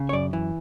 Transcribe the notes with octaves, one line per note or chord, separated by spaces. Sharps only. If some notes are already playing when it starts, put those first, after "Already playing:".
Already playing: C#3
C#5
F#2 D5
E3